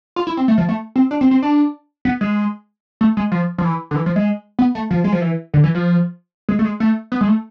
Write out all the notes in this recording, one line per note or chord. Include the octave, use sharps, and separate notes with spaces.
F4
E4
C4
A3
F3
A3
C4
D4
C4
C4
D4
B3
G#3
A3
G#3
F3
F3
E3
D3
E3
F3
G#3
B3
A3
F3
G#3
F3
E3
D3
E3
F3
G#3
A3
G#3
A3
B3
G#3
A3